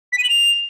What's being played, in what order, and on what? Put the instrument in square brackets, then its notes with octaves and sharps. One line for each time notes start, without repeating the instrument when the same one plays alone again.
[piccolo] B6
D#7
F#7
F7